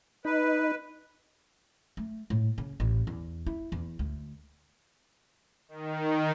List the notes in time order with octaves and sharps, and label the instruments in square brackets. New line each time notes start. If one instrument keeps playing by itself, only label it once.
[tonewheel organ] D#4 [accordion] B4
[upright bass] A3
A2
C#3
A1
E2
E4
E2
D2
[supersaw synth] D#3